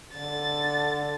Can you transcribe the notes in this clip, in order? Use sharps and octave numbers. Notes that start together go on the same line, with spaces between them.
D3 A6